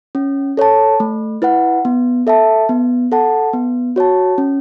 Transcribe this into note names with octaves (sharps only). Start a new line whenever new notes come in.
C#4
A4 C#5 A5
A3
E4 B4 F#5
B3
A4 E5 A5
B3
A4 F#5 A5
B3
F#4 C#5 A5
C#4